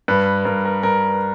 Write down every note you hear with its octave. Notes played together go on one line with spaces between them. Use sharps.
G2 B4
G2 A#4
A#4
G2 A#4